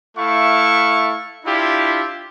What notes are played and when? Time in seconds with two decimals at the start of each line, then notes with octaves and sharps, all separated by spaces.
0.17 A3 E4 F5 C#6
1.45 D4 E4 F4 G4